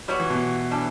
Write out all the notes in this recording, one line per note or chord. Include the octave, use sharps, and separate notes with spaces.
F#3 G3 B3 F#4
E3
B2
E3 G3 D4 A4